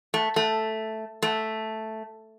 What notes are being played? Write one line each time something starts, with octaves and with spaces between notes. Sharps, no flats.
A3
A3
A3